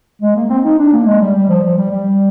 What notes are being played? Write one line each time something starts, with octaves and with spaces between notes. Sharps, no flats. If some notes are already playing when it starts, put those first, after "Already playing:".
G#3
A#3
C4
D#4
D4
A#3
G#3
G3
G3
F3
F3
G3
G3